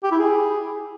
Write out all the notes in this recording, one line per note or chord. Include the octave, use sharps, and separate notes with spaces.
G4
E4
G#4